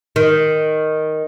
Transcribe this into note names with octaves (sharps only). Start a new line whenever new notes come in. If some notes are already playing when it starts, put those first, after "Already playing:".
D#3